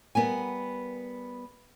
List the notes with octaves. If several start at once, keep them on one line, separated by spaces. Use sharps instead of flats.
G3 B3 A#4 G#5